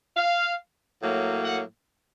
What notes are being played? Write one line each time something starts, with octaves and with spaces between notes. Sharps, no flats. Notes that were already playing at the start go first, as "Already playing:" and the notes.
F5
A2 F#3 A#3
F#5